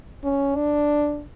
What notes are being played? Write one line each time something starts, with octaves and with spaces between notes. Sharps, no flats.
C#4
D4